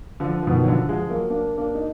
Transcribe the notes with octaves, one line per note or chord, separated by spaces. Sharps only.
D3 F3
F3
B2 D#3
F#3
D3 F3
F3 G#3
F#3 A#3
A#3 D4
A#3 D4
D#4